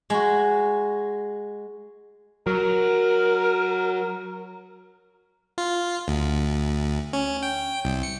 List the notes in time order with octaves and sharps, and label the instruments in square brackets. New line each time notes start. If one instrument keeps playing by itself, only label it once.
[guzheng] G#3 F#4
[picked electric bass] F#3 [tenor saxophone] A#4
[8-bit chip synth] F4
D2
C#4
G5
C2
C#7